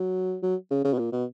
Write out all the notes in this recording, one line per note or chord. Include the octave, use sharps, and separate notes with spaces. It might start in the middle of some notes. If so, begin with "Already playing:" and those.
Already playing: F#3
F#3
C#3
C#3
B2
A#2
B2